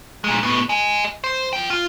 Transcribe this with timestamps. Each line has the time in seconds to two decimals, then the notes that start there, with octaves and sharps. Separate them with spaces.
0.24 A#2 G#3
0.43 A2 B3
0.69 D#5 G#5
1.24 C5
1.53 F4 G5
1.70 F4